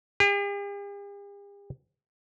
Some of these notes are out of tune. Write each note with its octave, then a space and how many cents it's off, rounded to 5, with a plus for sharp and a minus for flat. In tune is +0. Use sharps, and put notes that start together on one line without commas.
G4 +45